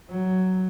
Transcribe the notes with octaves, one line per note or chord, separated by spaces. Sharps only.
F#3